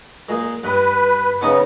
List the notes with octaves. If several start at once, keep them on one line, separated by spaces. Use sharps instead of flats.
A#2 G#3
G2 B4
C#3 B3 C#4 D#4